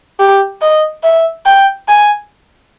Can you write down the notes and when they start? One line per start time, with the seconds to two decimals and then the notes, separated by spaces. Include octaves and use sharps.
0.20 G4
0.61 D#5
1.03 E5
1.46 G5
1.88 G#5